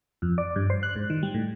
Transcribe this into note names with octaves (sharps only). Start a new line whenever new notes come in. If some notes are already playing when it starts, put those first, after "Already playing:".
F2
D5
G2
C5
F#6
G#2
D#3
G3
A2